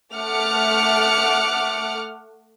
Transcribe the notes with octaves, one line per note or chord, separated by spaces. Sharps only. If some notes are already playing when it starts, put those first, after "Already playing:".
A3 F#5 D6 F6 C#7